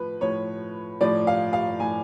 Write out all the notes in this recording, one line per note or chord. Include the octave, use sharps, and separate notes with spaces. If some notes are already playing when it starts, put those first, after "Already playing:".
Already playing: A2 F3 B4
A2 F3 C#5
A2 F3 D5
F5
F5
A2 F3 G#5